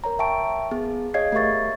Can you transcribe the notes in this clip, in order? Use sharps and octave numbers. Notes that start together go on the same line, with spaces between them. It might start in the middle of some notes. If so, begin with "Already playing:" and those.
A#4 C#5 A#5
E5 G5 A5 C#6 D7
B3 G#4
G#4 C#5 D#5 F5 G#6 C7
A3 G4 A#4 E5 C#6 A6